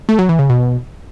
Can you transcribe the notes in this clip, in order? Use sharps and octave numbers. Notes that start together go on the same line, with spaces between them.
A3
F#3
E3
C#3
B2